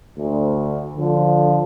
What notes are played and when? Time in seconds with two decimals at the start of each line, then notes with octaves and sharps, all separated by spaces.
0.17 D2
0.98 D3 F3